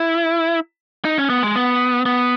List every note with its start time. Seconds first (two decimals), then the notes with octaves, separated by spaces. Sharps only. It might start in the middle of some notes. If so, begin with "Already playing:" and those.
Already playing: E4
1.05 D#4
1.18 C#4
1.30 B3
1.43 G#3
1.56 B3
2.06 B3